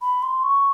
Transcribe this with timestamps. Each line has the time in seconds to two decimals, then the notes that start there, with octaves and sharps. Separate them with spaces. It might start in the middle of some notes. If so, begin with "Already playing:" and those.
0.01 B5
0.22 C6
0.43 C#6